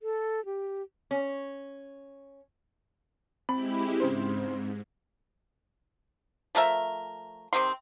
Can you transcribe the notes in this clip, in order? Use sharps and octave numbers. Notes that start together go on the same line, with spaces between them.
A4
G4
C#4
G#3 C4 E4 G4 B5
G#2 C#3 C5
F3 A3 A#4 E5
C3 D#3 C4 C6